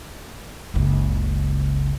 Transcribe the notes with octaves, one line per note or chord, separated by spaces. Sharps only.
F#1 C#2